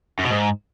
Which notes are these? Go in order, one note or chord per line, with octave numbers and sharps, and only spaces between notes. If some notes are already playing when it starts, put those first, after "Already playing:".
F#2
B2
G#2